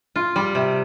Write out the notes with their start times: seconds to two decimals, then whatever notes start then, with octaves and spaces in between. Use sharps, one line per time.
0.16 F4
0.36 G3
0.55 C3